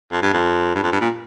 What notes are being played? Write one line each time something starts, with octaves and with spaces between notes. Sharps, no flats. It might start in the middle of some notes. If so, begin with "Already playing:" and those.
F2
G2
F2
G2
F2
G2
A#2